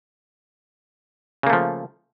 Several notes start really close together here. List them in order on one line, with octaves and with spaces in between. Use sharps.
C#3 A#3 A3 F3